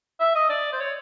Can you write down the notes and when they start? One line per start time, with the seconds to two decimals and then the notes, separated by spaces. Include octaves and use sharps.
0.20 E5
0.35 D#5
0.50 D5
0.73 C5
0.80 C#5